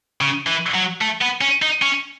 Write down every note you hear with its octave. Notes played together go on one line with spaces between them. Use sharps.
C#3
E3
F#3
A3
B3
C#4
D#4
C#4